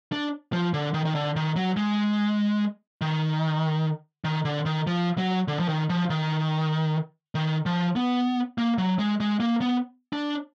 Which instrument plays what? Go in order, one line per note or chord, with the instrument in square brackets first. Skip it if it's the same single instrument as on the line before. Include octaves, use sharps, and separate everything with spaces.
[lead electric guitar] D4
F3
D3
D#3
D#3
D3
D#3
F#3
G#3
D#3
D#3
D3
D#3
F3
F#3
D3
F3
D#3
F3
D#3
D#3
F3
B3
A#3
F#3
G#3
G#3
A#3
B3
D4